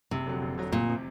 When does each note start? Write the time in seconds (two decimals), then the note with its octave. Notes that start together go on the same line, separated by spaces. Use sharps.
0.11 F#1 C3
0.26 F2 D3 F#3
0.42 F#1
0.57 F2 D3 F#3
0.72 F1 A#2
0.90 C3